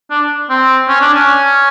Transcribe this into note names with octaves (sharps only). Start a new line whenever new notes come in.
D4
C4
C#4
D4
C#4